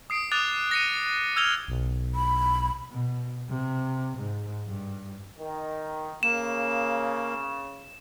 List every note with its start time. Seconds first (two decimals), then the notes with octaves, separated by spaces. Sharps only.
0.10 D#6 C7 D7
0.32 D6 D#6 F#6 A6 F7
0.71 A#6 C#7 D#7
1.36 E6 F6 G#6 F7 G7
1.68 B1
2.15 B5
2.91 B2
3.48 C3
4.17 G#2
4.67 G2
5.39 D#3
6.23 C#3 A#3 E7